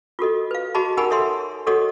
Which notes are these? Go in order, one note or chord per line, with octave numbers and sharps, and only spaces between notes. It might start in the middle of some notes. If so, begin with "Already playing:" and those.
F4 F#4 A4 D#5
B4 F5
F#4 G#4 D#5 A5 B5
D#4 G4 A#4 F#5 G#5 B5
A4 C#5 E5 F#5 C6
F#4 G#4 A4 C#5 D#5 F#5